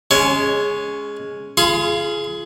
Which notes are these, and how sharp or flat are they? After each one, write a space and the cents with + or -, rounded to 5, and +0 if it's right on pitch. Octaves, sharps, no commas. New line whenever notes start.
G#3 +0 C#4 +0 G#5 +40
F4 -20 G#4 +20 B5 +45